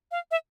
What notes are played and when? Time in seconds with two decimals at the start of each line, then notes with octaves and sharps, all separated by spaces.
0.11 F5
0.31 E5